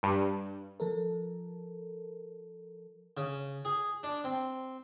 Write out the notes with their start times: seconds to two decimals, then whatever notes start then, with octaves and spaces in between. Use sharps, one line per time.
0.03 G2
0.80 F3 A4 A#4
3.17 C#3
3.65 G#4
4.03 D4
4.24 C4